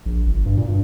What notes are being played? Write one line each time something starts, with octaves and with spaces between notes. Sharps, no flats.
A#1
G1
G2
A#2
G2